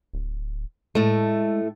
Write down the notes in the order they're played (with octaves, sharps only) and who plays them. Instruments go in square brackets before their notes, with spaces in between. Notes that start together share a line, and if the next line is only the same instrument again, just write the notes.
[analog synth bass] D1
[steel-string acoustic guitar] A2 A3 [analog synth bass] G#3